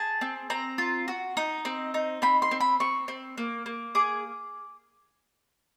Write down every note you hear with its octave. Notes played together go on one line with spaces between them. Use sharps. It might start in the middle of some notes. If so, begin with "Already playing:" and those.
Already playing: G#4 A5
C4
C4 A#5
F4
F#4
D#4
C4
D#4
C4 B5
C6
C4
B5
C4 C#6
C4
A#3
A#3
G#4 D6